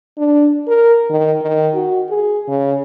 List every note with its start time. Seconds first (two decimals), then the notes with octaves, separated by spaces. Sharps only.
0.17 D4
0.67 A#4
1.10 D#3
1.42 D#3
1.74 F#4
2.09 G#4
2.48 C#3